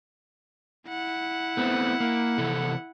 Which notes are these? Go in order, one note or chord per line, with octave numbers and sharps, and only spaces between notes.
E4 F#5
A3 B3 C4
A#3
C3 E3 A4